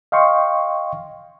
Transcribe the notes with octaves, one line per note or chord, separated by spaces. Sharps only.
D#5 F5 G5 C6 C#6